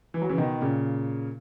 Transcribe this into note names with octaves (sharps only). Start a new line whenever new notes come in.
E3
F#3
C#3 E3
B2 D#3
A#2 C#3